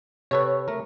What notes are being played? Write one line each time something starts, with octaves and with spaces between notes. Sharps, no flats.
C3 A4 B4 C#5
A3 A#4